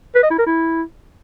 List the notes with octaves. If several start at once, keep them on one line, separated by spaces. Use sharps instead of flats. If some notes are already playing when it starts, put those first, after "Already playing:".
B4
D#5
E4
A#4
E4